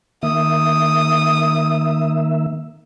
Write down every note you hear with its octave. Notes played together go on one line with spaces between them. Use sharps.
D#3 A#3 E5 D#6